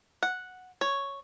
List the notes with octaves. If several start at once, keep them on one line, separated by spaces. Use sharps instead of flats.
F#5
C#5